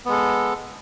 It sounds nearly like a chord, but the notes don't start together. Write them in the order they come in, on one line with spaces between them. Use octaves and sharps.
B3 G#3 A4